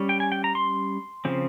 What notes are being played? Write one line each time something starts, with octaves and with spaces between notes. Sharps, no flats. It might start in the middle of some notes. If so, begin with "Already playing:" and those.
Already playing: G3 C#4
G5
G#5
G5
A#5
C6
C#3 F3 C4